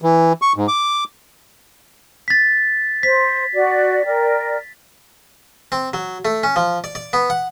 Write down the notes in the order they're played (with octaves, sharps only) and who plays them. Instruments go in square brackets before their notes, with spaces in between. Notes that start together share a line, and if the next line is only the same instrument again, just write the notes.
[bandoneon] E3
C#6
G#2
D6
[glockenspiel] A6 B6
[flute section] C5 [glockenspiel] B6
[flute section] F#4 D5
A#4 D5 G5
[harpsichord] C4
F#3
A3
C#4
F3
D5
D5
B3
F#5